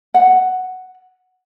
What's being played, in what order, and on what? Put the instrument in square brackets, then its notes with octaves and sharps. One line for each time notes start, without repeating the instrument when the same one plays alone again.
[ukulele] F#5